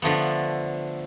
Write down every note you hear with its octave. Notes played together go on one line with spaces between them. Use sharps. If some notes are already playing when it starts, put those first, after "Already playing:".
D3 F3 A3 B3